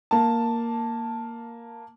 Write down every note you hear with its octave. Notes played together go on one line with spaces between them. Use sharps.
A#3 A5